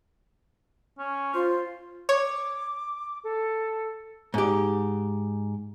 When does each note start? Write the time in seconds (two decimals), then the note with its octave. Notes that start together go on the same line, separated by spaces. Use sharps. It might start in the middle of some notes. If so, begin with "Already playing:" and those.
0.98 C#4
1.34 F4 C5
2.09 C#5 D6
3.24 A4
4.34 G#2 G4